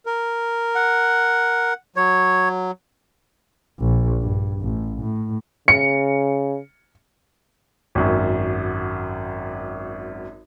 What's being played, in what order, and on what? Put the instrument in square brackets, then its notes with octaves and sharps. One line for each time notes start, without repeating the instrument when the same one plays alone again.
[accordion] A#4
[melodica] F#5
[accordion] F#3 [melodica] C#5
[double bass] A#1
G2
A1
A2
[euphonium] C#3 [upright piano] C#7
[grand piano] G#1 F#2